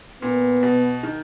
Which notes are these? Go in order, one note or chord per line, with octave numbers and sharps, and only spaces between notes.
A#2 B3
B2
D#3